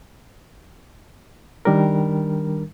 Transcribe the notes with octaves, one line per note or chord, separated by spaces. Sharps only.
D#3 G3 D4 A#4